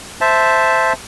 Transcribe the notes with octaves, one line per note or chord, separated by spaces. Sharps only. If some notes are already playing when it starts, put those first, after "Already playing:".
C5 E5 A5